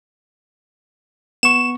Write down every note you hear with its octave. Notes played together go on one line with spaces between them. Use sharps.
B3 C#6 E7